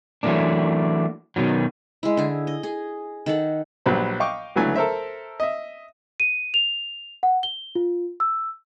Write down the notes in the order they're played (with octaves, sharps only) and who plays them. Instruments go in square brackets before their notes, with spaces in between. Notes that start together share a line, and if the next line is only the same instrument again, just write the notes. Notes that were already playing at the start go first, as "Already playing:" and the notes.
[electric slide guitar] E3 F#3 A3 A#3 D4
B2 D#3 F#3
[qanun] G#3 E4
D3 G#4
D#5
G#4
D#3 A4 F#5
[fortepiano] A#1 F#3 G3 B4 C5 B5
D#5 F5 G5 C#6 D6
C#2 D3 E3 F#3 A3 G#5
A4 A#4 C5 E5
D#5 E5
[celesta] D#7
F7
F#5
G7
F4
E6